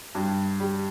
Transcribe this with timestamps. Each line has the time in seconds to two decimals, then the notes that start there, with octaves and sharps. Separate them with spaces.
0.15 G2
0.60 G3